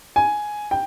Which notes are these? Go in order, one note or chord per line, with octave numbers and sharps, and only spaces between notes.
G#5
G5